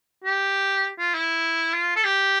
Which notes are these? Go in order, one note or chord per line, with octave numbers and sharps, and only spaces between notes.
G4
F4
E4
F4
A4
G4